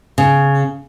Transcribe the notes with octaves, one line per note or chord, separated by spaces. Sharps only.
C#3